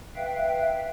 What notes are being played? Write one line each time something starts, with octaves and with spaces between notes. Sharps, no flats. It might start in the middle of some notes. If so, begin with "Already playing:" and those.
B4 E5 F5 G5